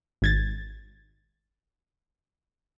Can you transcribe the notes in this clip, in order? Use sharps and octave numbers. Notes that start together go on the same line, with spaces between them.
G#1 G#6 A6